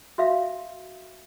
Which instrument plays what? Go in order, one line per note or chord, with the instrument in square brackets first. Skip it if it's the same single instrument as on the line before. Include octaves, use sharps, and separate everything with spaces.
[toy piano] F#4 E5 F5